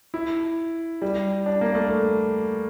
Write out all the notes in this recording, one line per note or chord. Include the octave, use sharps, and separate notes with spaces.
E4
G3
D4
A#3
A3